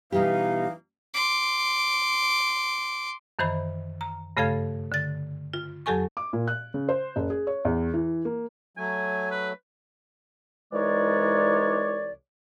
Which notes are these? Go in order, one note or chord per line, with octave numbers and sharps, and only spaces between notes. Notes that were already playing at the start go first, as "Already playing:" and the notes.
B2 E3 G3 D#4 G4 F5
C6 D6
F#2 D#3 E3 C5 B5
A#5
G2 C#3 A3 A4 F5 G#6
D3 A6
F4
F2 F#3 G4 A4 G#5 C#6
D6
A#2
F#6
C#3
C5
F#1
G#4
C#5
E2
E3
A#3
F#3 A3 G#5
B4
C2 E3 G#3 D#4 C#5 D5